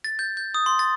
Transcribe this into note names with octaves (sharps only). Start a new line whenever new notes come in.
A6
G6
G6
D#6
C6
A6